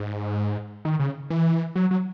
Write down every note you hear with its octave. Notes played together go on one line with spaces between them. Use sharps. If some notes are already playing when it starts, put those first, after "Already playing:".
Already playing: G#2
D#3
C#3
E3
F#3
F#3